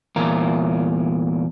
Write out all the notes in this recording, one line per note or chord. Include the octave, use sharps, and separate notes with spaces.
E2 A#2 A#4